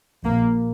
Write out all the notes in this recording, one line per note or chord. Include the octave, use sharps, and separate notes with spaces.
A#1 A#2 A#3